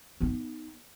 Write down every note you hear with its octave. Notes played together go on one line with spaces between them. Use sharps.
B3 D#4